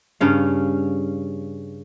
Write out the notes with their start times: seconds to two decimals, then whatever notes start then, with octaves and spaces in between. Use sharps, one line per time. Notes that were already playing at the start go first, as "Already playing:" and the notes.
0.21 G2 C#3 C#4 F5